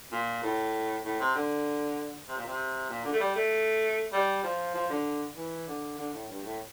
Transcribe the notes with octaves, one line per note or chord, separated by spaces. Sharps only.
A#2
A2
A2
C3
D3
C3
A#2
C3
A#2
D3
A3
G3
A3
G3
F3
F3
D3
E3
D3
D3
A2
G2
A2